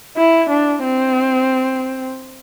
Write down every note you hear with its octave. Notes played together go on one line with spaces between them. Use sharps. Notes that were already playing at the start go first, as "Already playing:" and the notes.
E4
D4
C4